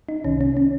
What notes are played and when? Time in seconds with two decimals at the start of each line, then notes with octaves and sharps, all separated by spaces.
0.09 D#4
0.24 C2 C3 D#3 C#4
0.41 C#4
0.57 C#4